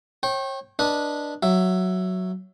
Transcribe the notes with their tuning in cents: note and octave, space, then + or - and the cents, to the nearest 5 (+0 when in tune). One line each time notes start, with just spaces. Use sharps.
C#5 -40 G5 -10
D4 +0 B4 -20 D#5 +0
F#3 +0 E5 +5